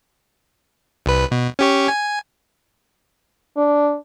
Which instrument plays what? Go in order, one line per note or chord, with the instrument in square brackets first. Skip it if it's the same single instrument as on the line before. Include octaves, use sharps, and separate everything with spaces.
[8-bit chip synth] C2 B4
B2
C#4 G4 C#5
G#5
[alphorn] D4